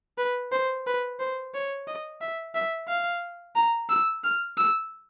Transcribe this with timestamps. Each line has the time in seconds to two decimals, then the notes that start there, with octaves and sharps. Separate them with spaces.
0.18 B4
0.52 C5
0.86 B4
1.19 C5
1.54 C#5
1.87 D#5
2.21 E5
2.55 E5
2.88 F5
3.56 A#5
3.89 E6
4.24 F6
4.57 E6